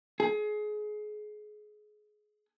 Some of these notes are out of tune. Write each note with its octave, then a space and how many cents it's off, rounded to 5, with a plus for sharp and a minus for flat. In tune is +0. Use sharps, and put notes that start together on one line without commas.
G#4 +25